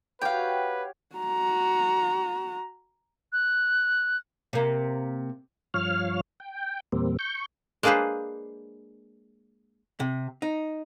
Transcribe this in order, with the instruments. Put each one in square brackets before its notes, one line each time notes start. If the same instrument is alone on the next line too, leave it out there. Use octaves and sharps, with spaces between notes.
[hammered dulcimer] F#4 G4 C#5 [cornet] B4 [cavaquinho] F5 G5
[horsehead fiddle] F#4 A#5
[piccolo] F#6
[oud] C3 A#3
[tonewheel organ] G2 F3 C#5 F5 F6
G5
E2 A#2 G3 A#3 C4
C#6 G6
[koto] G#3 A#3 D4 G#4 B4 C5
[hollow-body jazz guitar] C3
D#4